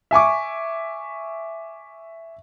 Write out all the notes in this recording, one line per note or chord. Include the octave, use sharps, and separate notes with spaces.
E5 G#5 C#6 D6